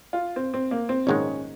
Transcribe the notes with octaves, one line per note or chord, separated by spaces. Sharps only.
F4
C4
C4
A#3
C4
A#1 G#2 D#3 G#3 C#4